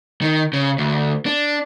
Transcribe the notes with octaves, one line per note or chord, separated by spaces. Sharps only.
D#3
C#3
D2
D4